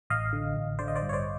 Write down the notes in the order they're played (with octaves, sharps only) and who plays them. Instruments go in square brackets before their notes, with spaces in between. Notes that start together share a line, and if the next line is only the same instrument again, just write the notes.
[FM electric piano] A1 D#5 F5
D3
A1
D3 C5 D5
D#5
C5 D5
G2
C#5
C5 D5